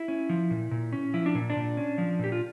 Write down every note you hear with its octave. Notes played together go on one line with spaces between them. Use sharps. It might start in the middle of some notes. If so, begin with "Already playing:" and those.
Already playing: E4
C#4
F3
A#2
A#2
C#4
F3 E4
D4
A#2
D4
A#2
C#4
F3
A#2 G4
F4